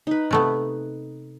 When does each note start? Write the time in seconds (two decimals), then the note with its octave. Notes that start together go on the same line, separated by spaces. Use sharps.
0.07 D#4 B4
0.31 C3 A3 B3